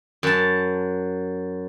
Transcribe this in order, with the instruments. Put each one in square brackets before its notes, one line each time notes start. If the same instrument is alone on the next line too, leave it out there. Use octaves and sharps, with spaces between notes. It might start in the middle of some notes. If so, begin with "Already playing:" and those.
[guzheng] F#2 A5